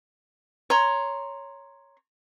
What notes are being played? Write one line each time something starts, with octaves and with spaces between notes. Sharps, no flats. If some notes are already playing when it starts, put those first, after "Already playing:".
C#5 A#5 C6